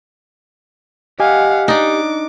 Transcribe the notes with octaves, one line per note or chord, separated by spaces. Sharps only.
G4 D#5 F5 F#5 G#5
D4 D#4 D6